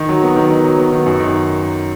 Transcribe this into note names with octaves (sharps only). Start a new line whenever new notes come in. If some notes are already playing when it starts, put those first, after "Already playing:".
Already playing: D#3
F#3
B3
D#3
D#3
F#3
B3
D#3
F#2
D#3